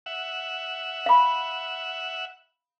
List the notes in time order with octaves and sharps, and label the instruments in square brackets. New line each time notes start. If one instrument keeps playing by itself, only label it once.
[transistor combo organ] E5 F#5
[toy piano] F5 B5